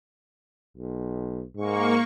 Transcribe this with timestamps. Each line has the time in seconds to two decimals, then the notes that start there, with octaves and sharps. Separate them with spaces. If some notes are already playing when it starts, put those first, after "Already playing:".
0.77 B1
1.57 G#2 A#3 C#6